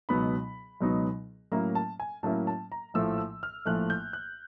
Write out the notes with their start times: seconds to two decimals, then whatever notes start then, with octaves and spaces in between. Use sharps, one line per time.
0.09 C#2 B2 F#3 B3 D#4 B5
0.81 C#2 B2 F#3 B3 D#4
1.52 A2 F#3 A#3 C#4 E4 A#5
1.75 A5
2.00 G#5
2.23 A2 F#3 A#3 C#4 E4 A5
2.47 A5
2.72 A#5
2.94 A#1 A2 F3 A3 E6
3.18 E6
3.43 F6
3.65 A#1 A2 F3 A3 F#6
3.90 G6
4.13 F#6